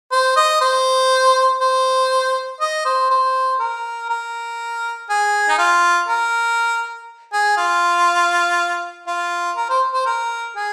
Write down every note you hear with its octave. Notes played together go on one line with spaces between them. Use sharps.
C5
D#5
C5
C5
D#5
C5
C5
A#4
A#4
G#4
D#4
F4
A#4
G#4
F4
F4
A#4
C5
C5
A#4
G#4